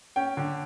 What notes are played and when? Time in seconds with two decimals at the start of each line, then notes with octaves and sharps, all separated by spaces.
0.16 C#4 G5
0.37 D3